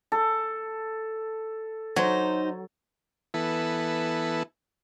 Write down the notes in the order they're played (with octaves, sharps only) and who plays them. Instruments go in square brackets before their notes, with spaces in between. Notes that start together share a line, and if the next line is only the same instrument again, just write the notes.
[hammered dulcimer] A4
[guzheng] F#3 [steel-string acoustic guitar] D#4 C5
[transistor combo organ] E3 B3 E4 A4